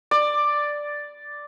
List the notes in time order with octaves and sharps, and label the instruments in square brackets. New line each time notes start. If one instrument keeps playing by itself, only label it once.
[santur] D5